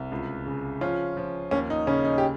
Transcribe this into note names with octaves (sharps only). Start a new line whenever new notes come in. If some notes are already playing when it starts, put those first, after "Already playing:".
Already playing: C2
C#2
C#3
F3 C#4 F4
F3
D#2 C#4
D#4
C#3 C#4
D#4
G4